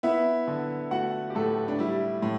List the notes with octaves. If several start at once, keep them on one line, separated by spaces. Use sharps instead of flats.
B3 E4 E5
D3
A3 F#4 F#5
G4
A2 A3 A4
D4
G3 E4
A2